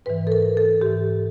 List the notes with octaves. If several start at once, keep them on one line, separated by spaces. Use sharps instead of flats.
G#2 E3 B4
A4
A#4
A4
G#2 E3 G4